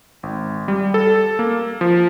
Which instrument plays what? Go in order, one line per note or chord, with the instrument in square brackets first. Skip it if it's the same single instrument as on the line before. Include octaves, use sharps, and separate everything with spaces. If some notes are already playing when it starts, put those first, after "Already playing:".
[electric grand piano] G#1
G3
A4
A#3
F3